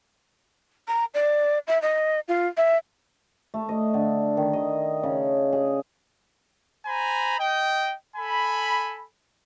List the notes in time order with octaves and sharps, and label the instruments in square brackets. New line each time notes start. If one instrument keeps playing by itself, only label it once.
[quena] A#5
D5
E5
D#5
F4
E5
[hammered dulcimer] A3
D#5
D3
D#3
D#5
C#3
G#4
[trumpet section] C5 G#5 A#5 B5
D#5 G5
A4 G#5 B5